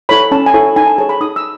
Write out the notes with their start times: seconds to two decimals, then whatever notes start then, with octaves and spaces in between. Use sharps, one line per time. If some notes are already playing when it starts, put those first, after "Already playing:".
0.09 E4 A4 C#5 B5
0.32 C#4 A5
0.46 G#5
0.54 E4 A4 C#5
0.76 D#4 G#5
0.87 A5
0.98 G#4 C#5 A5
1.09 B5
1.21 D#4 D#6
1.36 E6